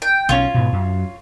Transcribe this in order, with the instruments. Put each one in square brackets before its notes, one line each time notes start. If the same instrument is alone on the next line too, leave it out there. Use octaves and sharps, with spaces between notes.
[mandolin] G5
[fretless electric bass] B1 F#3 C#4 [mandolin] F4 C#5
[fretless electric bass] G#2 B2
F#2